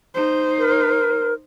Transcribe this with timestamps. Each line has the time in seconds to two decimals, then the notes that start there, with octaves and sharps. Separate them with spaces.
0.14 D#4 C5
0.59 A#4